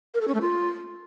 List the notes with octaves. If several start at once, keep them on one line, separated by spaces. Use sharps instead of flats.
A#4
A4
C#4
A3
F4